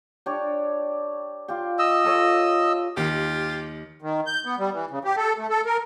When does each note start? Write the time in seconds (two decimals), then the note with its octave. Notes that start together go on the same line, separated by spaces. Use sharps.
0.26 D4 G4 C#5
1.48 F4 G4
1.79 D#5 E6
2.04 F4 A4 C#5
2.97 D#2 F4 G4
4.02 D#3
4.26 G6
4.45 B3
4.59 G3
4.72 E3
4.91 C#3
5.04 G4
5.17 A4
5.38 A3
5.50 A4
5.66 A#4